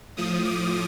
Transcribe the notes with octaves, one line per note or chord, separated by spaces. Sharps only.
A2 F3 D#6
D6